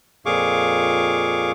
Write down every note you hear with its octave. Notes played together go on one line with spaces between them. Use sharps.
F2 A#2 G#4 F5 C#6 D6